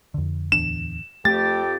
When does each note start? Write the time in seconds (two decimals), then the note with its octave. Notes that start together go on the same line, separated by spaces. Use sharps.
0.14 F2 D3
0.52 D1 E2 D4 E7
1.25 F2 A3 G4 A6